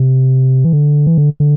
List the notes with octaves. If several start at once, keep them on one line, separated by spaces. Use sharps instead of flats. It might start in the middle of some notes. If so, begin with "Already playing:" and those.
Already playing: C3
E3
D3
E3
D3
D3